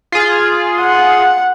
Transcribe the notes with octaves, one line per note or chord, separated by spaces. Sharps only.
F4 G#4
F#5